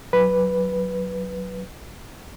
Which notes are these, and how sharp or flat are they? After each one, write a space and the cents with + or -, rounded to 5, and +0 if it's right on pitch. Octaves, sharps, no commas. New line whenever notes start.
F#3 +0 B4 +0